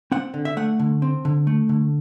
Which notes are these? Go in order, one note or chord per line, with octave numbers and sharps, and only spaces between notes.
C4 F#5
D3
E5
A3 F#5
D3
C4
D3
A3
D3